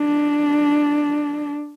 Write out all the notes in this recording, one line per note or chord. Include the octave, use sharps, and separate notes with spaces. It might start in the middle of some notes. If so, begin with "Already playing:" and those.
Already playing: D4